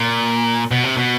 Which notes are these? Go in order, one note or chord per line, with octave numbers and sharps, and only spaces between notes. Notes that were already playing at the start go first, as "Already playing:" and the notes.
Already playing: A#2
B2
C3
B2